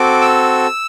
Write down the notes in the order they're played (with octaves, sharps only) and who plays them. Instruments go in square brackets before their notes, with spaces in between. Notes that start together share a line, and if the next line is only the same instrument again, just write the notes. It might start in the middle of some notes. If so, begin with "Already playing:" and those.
Already playing: [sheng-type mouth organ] C4 F#4 A4 D6
E6